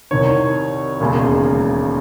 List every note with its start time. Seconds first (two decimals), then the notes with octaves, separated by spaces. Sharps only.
0.11 C2 C3 D#3 C#5
1.00 E1 D#2 C#3 G#3